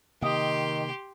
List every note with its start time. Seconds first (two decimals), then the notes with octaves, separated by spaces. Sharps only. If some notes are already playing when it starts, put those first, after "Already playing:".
0.22 C3 D#3 A#3 G4 D#5 C6